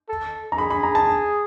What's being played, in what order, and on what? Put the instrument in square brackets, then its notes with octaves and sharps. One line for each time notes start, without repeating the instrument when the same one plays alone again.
[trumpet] A4
[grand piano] A#5
[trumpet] G#4 [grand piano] B5
[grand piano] B5
A#5
A5